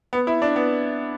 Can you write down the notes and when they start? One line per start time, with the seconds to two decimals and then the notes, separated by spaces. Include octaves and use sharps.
0.13 B3
0.27 E4
0.42 D4
0.56 B3